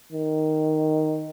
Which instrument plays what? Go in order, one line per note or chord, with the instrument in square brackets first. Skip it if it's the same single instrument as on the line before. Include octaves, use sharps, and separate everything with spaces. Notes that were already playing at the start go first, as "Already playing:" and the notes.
[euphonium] D#3